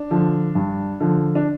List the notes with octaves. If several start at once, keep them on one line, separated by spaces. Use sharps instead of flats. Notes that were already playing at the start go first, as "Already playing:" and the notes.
Already playing: D4
D3 F3
G2
D3 F3
D4